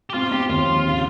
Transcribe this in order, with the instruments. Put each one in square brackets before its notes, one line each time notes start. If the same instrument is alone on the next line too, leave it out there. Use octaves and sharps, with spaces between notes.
[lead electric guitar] G4
[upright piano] C4 [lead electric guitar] F4
[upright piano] C4 [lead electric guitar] G4
[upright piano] D#2 [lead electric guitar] F4
[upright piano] F3
C#3